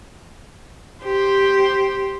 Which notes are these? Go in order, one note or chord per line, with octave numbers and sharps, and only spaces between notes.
G4 C5